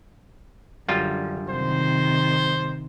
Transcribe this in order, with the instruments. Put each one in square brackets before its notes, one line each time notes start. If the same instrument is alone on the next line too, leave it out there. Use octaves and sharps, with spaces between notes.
[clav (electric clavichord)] F#2 G3 F4 [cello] D3
[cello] C3 D#3 [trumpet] C5